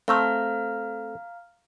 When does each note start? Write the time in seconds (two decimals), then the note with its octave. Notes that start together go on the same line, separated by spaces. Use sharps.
0.08 A3 C4 F5 A#5 F6